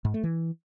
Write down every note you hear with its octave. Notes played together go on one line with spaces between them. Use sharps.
G#2
A3
E3